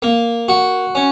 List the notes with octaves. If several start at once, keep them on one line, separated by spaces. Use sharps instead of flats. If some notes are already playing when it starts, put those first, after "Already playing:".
A#3
F#4
C#4